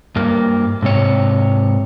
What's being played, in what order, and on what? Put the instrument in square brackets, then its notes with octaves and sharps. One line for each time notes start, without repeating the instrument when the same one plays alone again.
[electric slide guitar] G2 A#3
G#2 C3 C#5